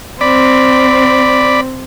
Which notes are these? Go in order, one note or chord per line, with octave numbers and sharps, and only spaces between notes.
C4 D5 B5